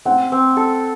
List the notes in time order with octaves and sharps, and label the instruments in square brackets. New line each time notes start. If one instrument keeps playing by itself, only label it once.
[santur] C4 [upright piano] F#5
[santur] C4
A4